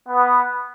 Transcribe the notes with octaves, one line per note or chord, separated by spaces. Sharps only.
B3